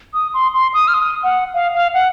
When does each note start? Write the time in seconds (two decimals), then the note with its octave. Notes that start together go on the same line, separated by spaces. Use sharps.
0.14 D#6
0.34 C6
0.53 C6
0.74 D#6
0.88 F6
0.94 D#6
1.23 F#5
1.54 F5
1.74 F5
1.94 F#5